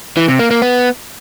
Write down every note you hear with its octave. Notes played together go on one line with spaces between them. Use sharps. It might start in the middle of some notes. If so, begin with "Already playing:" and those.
E3
C3
A#3
A#3
B3